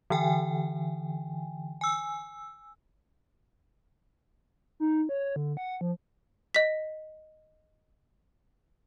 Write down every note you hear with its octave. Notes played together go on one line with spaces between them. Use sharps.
D3 E3 G5 G#5
G#5 E6
D#4
C#5
D3
F#5
F3
D#5 B6